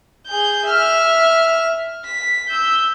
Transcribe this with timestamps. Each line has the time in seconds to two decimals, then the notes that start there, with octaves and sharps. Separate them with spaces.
0.27 G#4 G6
0.66 E5 F6
2.05 B6
2.49 E6 G6